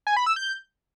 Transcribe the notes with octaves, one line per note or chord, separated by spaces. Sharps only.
G#5
B5
E6
G6